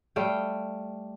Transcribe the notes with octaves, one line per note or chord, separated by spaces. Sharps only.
G3 A3 F5 G5